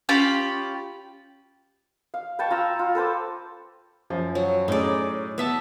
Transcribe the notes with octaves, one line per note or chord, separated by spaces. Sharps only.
C#4 F4 G4 B5
F5
B4 G5 A5 C#6
F4 A#5 E6
F4
A4 B4 C5 D6
F#2 F3
F#3
A2 C#4 D#4 G#4 D5
B3 E5 A5